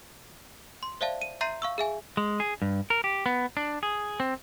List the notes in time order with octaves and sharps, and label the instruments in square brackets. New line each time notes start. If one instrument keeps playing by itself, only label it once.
[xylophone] C6
C5 D5 E5 F5 A5
D#7
E5 A#5 C6 G6 C7 D#7
F5 C#6 E6
G#4 E5 G#5
[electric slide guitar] G#3
G#4
G2
A#4
G4
B3
D4
G#4
C4